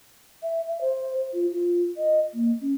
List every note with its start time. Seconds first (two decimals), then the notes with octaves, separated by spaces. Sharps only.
0.43 E5
0.68 E5
0.81 C5
1.33 F4
1.52 F4
1.97 D#5
2.34 A#3
2.62 C#4